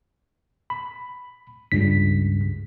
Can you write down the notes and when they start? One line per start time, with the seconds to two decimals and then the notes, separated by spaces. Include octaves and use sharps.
0.70 B5
1.72 C#2 G2 B6